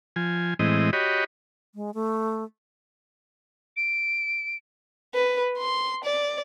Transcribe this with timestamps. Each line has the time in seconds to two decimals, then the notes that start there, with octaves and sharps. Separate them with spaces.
0.16 F3 G#5
0.59 A2 E3 G#3 C4 D#5
0.93 F#4 G4 C#5 D#5 B5
1.75 G#3
1.94 A3
3.76 D7
5.14 B4
5.57 C6
6.04 D5